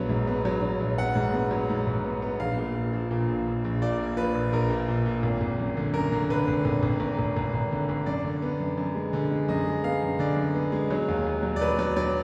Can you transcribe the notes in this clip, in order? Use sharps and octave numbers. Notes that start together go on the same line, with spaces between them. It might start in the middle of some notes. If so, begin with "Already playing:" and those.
Already playing: A#1 F#3 B3
G#2
B3
F#3
F#3
A#1
B3 F#5
G#2
B3
F#3
G#2
G#2
B3
B3
A#1 F5
A#2
A#2
F3
A#2
A#1
A#1
A#1
A#2 D5
A#3
F3 B4
A#1
A#1 A#4
A#2
A#2
A#2
G#1
G#1
F#2
D3
F#2 A#4
D3
D3 B4
G#1
G#1
G#1
G#1
G#1
G#1
G#1
D3
G#1
F#2 D5
D3
B3
F#2
F#2
G#3
D3
G#3
F#2 D#5
G#3
B3 F5
F#2
D3 D5
F#2
B3
G#3
F#3
D#2
D#2
F#3
D5
F#3 B4
F#3 D5
F#3 D5